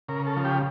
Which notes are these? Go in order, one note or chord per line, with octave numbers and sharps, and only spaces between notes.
C#3 A#4
A4
F3
G4